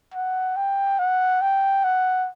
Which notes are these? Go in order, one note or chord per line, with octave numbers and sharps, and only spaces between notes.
F#5
G5
F#5
G5
F#5